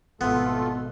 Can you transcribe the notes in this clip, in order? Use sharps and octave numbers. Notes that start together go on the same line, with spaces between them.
G#1 B2 A3 B3 F4 A4